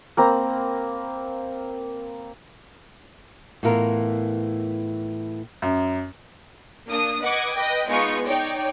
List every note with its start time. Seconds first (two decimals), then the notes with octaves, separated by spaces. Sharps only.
0.17 A#3 C4 A#5 B5
3.63 A2 E3 B3 F4 A#4
5.62 F#2
6.88 A#3 D4 D#6
7.21 B4 D#5 F#5 D6 D#6 G#6
7.54 B4 D#5 G5
7.89 G#3 B3 D#4 F4 B4 C#6
8.27 D#4 C#5 D5 G5